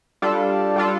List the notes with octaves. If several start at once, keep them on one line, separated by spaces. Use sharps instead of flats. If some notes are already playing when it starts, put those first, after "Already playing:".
G3 D4 F4 A4
G3 D4 F4 A4